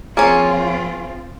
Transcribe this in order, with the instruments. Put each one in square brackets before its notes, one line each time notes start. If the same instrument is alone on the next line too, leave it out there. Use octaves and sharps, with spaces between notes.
[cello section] F3 C4 F4 [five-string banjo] A#3 C#4 C#5 [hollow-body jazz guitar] G#4